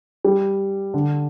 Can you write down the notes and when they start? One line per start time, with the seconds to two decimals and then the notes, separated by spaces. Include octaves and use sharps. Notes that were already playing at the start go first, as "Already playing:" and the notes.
0.25 G3
0.94 D3